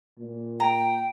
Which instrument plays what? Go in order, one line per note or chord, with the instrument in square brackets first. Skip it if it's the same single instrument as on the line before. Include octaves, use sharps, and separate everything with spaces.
[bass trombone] A#2
[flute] G5 [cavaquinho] A#5